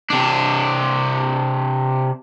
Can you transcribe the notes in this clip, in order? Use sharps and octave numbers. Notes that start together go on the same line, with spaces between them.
C3 D4